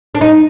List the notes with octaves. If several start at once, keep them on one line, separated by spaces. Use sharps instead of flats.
D4
D#4